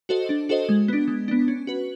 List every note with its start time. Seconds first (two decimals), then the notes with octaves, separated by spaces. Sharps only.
0.09 F#4 A4 C5 D#5
0.29 D4
0.49 F#4 A4 C5 D#5
0.69 G#3
0.88 B3 D4
1.08 G#3
1.28 B3 D4
1.48 C#4
1.67 F#4 B4